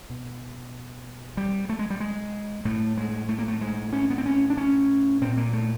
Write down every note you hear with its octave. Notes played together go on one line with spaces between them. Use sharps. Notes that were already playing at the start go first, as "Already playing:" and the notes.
B2
G3
A3
G#3
G3
G#3
A2 A3
G#3
A3
A#3
A3
G#3
C#4
B3
C4
C#4
D4
C#4
A#2 C4
A#3
A3